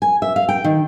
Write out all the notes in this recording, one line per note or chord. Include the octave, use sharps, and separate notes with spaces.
G#5
E5
F5
G5
D#3